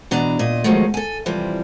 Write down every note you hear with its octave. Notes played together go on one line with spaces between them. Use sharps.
B2 E3 D4 A#5
A#2 D#5
D#3 F3 F#3 G#3 A3
A4 G#5
C3 E3 F3 G3